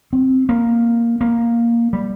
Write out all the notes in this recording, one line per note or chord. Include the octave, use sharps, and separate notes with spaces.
C4
A#3
A#3
G3